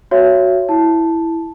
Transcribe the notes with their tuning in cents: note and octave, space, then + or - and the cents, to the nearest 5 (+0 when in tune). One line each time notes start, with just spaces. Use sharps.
F#4 +0 C#5 +0 E5 +35
E4 +0 A5 +0